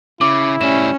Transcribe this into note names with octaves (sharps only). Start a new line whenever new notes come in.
C#3 E4 D6
A2 G3 C#4 E7